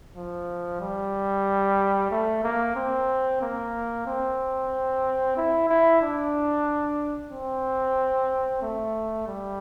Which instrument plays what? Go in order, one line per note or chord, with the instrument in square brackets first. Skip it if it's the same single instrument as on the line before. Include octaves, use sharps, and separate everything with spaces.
[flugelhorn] F3
G3
A3
A#3
C4
A#3
C4
E4
E4
D4
C4
A3
G3